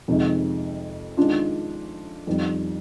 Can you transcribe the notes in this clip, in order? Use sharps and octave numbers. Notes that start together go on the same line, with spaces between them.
F2 C3 D#3 G#3 D#4
D#3 G#3 D4 F4
F2 D#3 G3